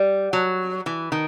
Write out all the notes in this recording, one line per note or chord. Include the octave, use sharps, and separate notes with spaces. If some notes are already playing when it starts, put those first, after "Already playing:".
Already playing: G3
F#3
E3
D#3